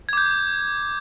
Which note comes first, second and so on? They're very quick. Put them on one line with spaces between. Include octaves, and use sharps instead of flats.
G#6 D6 G6